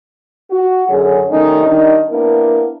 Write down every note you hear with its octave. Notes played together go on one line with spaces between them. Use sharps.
F#4
F#2 D3 F#3 G#4
D#3 G3 A3 C#4 D#4
D#3 G3 D4 D#4
A#3 B3 D4 E4 A#4